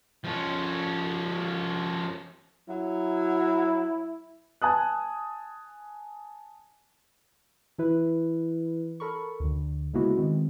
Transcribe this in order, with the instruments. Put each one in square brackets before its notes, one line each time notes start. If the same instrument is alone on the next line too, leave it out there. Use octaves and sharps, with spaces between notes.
[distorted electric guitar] F3 C#4
[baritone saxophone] F#3 [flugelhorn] E4
[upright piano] G#5 A5 D#6 F#6
[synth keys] E3 E4 B4
A4 A#4 B5 C#6
D2 D3
C#3 G#3 A#3 B3 E4 F#4
D#3 G#3 B3 C4